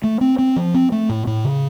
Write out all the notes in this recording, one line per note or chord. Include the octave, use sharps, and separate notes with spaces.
A3
C4
C4
F3
C4
A3
A2
A2
C#3